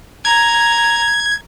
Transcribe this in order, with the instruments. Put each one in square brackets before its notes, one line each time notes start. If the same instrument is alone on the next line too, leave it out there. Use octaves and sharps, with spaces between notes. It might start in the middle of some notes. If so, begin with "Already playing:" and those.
[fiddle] A#5 [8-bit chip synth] G#6